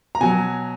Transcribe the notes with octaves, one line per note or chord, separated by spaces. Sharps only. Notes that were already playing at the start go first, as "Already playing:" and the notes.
A#5
B2 F#3 G#5